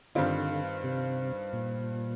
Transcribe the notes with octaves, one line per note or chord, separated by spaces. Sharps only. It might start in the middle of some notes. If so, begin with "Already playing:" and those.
G2 D3 D#3 G3 C4 F4
C3
A#2